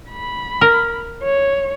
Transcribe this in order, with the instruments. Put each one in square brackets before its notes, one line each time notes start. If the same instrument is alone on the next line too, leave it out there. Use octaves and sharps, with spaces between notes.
[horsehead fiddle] B5
[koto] A#4
[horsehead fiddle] C#5